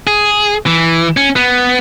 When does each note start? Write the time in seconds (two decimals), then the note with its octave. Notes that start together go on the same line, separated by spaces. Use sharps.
0.07 G#4
0.66 E3
1.17 C#4
1.36 B3